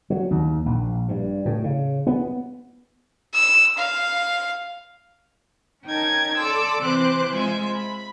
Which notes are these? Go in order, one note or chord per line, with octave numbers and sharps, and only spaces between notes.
F#3
D#2
A#1
G2
A2
C#3
B3
E6
F5
C#4 D#4 A#4 G5 A5 G#6
A4 D5 C6 D6 E6
C3 E3 C4 C5 D6 F#6
G#3 F4 C5 E5 G#5
B5